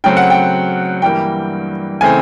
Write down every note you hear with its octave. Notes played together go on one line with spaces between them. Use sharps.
C#3 F#3 A3 C4 G5
F#5
G5
G2 E3 G3 A#3 G5
C#3 E3 A3 C4 G#5